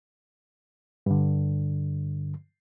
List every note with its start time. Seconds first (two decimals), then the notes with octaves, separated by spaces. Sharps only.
1.06 G2 D3